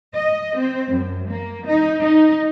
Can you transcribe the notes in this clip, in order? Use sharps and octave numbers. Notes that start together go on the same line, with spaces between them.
D#5
C4
F#2
A#3
D#4
D#4